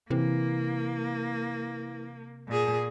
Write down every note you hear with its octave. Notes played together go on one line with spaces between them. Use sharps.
C3 E3 A#3
A#2 G#4